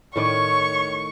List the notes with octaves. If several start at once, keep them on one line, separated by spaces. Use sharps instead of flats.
A2 D#3 C#5 D5 C#6